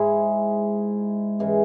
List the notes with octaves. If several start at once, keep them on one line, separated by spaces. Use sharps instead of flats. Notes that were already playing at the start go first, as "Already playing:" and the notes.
Already playing: G#2 G#3 E4
G#2 E3 G#3 C#4